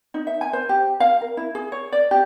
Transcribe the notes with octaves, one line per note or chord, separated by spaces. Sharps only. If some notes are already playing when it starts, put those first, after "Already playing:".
D#4
E5
G#5
C5
G4
F5
A#4
E4
G#4
C#5
D5
G4